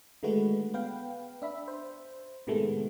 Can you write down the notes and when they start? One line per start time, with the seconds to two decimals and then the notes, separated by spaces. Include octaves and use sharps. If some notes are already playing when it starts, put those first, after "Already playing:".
0.23 D3 D#3 G#3 A3 F#4 B4
0.74 B3 B4 F5 G5
1.42 D4 E5 B5
1.68 C5
2.47 A2 C3 D#3 G#3 A3 B3